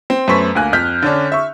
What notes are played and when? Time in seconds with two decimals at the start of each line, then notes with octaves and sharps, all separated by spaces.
0.10 C4
0.28 F#2 A3 B3 C5 C#6 B6
0.55 D2 A#3 G#5 F#6
0.73 F2 F6 G6 B6
1.02 D3 C#4 D4
1.32 E5 C#6